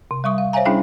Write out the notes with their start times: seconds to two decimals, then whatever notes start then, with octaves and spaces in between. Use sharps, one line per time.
0.11 C3
0.24 G3 E5 C#6 D#6
0.38 F5
0.53 C5 C#5 E5 F5 G#5 A#5
0.65 G3 C#4 D4 E4 G#4 G5